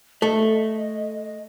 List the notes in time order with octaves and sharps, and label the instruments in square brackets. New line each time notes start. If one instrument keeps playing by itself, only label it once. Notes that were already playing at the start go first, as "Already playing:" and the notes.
[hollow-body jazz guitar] A3 [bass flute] D#5